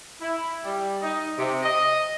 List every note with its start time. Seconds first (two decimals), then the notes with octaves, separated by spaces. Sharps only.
0.22 E4
0.64 G3
1.02 D#4
1.38 C3
1.63 D#5